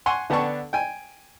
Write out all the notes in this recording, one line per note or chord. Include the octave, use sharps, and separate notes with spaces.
F#5 G#5 C6 C#6
D3 B3 D4 G5 A5 C#6
G5 G#5